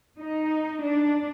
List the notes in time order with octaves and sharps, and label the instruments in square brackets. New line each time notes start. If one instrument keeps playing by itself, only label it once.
[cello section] D#4
D4